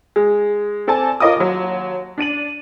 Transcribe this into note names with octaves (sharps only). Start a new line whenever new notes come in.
G#3
C4 A4 D5 G#5 A5
F4 A#4 C#5 D#5 D6 D#6
D#2 F#3
D4 D5 D#7 F#7